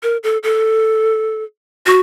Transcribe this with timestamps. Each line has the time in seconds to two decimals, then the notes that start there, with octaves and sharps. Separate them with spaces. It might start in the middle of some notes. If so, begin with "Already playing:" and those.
0.03 A#4
0.23 A4
0.43 A4
1.86 F#4